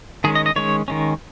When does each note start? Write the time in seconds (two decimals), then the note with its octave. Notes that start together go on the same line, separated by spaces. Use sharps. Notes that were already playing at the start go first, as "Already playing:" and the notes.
0.24 D#3 G#3 C#4 G#4
0.35 D#5
0.46 D#5
0.56 D#3 G#3 C#4 C#5
0.88 D#3 G#3 C#4